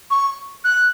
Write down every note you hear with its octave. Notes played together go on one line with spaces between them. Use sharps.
C#6
F#6